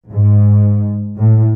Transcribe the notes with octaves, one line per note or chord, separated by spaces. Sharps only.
G#2
A2